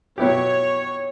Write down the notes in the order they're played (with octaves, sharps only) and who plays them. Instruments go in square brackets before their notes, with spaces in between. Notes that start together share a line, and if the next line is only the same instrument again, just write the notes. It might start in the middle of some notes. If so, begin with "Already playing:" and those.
[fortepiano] B2 F#3 B3 E4 G4 [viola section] C#5